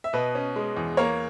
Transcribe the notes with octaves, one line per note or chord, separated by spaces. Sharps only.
E5
B2 B4 D#5
C#4
G#3
E2
A#3 A#4 C#5